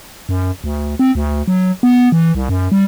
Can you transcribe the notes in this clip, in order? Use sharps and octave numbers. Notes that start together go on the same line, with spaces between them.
F#2
D2
C4
D2
F#3
B3
E3
C2
F#2
G3